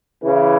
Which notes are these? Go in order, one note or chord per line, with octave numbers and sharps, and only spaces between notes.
C#3 E3